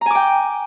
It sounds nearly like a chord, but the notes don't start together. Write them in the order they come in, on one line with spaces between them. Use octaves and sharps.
A#5 G#5 D6 G5